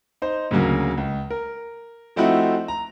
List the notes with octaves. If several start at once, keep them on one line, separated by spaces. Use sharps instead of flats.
D#4 C5
D2 C#3 F#3 A#3
C#2
A#4
F3 A3 C4 D#4 E4 F#4
A#5